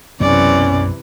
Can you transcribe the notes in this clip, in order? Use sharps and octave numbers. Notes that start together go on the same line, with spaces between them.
B1 F#2 C3 E3 B3 C#4 D5